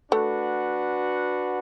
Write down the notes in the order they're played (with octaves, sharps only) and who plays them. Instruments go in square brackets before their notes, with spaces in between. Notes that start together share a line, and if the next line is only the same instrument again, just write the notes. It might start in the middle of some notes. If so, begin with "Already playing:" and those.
[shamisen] A3 [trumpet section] D4 F#4 B4 F#5